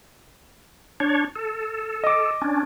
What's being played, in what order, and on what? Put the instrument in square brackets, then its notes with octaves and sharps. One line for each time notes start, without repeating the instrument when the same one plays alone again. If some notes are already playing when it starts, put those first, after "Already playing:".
[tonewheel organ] D4 C#5
A4
[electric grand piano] D#5 D6
[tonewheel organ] C#4 D4